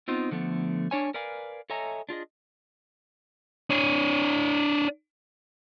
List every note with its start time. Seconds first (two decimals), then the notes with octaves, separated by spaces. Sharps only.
0.08 B3 C4 D#4 F4
0.31 D3 F3 A3 B3
0.91 D4 C#5 G#5
1.14 A#4 B4 D5 F5 G#5
1.70 A4 C#5 D#5 E5 G#5 A#5
2.09 D4 F4 G#4 D#5
3.70 D4 C#5